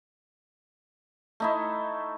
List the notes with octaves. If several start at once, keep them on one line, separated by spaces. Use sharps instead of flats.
A3 D#4 E4